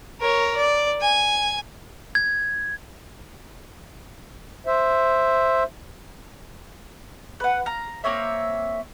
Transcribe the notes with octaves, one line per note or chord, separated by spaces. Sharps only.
A#4 C#5
D5
G#5
G#6
C5 E5
B4 F#5
F5 A#5
A#3 C4 C#5 E5